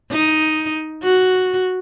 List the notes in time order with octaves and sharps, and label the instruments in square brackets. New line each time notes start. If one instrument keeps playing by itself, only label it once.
[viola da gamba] D#4
F#4